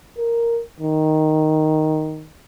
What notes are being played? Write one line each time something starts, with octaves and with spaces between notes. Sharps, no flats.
A#4
D#3